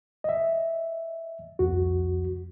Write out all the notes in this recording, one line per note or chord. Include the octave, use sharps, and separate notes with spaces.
D#5 E5
C2 F2 F#4